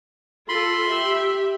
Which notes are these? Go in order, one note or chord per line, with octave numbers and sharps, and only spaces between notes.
F4 A4 B5 C6
G4 E5